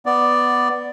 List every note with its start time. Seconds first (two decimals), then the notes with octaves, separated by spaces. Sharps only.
0.06 B3 D5